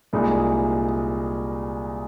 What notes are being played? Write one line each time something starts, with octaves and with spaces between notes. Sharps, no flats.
C2 A#2 G#3 D#4